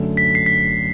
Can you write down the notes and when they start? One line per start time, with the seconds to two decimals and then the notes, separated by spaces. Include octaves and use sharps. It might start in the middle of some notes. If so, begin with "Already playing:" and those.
Already playing: F#2 D3 A3
0.17 B6
0.35 C7
0.46 B6